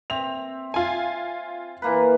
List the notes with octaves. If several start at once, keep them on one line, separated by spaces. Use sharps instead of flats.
C4 E5 F7
F4 G#5
E3 A#3 B4